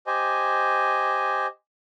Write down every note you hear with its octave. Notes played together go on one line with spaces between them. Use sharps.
G4 C5 D#5 G#5